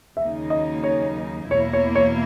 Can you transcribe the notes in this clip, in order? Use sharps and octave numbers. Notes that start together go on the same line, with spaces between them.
D#2 C#3 F#3 A#3 D#4 E5
D#5
C#5
E2 B2 A#3 E4 C#5
C#5
C#5